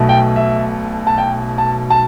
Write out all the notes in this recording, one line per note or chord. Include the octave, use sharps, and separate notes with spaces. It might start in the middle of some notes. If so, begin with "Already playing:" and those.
Already playing: B1 B2 A3
G5
E5
A5
G5
A5
A5